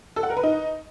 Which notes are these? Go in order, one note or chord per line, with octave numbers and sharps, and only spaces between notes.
A4
F#5
A#4
B4
D#4